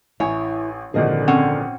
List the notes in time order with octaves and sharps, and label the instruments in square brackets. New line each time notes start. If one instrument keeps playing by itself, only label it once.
[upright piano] A1 G#5 [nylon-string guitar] E4 [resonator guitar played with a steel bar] C#5
[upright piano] G#1 A#2 F3 [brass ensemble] D3 [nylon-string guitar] G#4 A#4 D#5
[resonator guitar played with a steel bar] C4 C#4 F#5